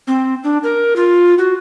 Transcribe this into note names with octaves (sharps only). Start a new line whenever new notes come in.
C4
D4
A#4
F4
F#4